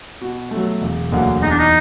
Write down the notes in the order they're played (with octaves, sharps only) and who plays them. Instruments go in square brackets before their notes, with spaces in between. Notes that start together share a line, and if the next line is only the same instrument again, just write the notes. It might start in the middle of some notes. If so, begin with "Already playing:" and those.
[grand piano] B2
F#3 A3
E1
D2 D3 F#3 A#3
[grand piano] E2 [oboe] D#4
[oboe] D4
D#4